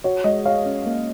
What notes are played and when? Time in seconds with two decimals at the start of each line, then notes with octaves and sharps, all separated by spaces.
0.04 F#4 C#5
0.24 G#3 D#5
0.46 C#5 F5
0.66 C#4
0.86 A#3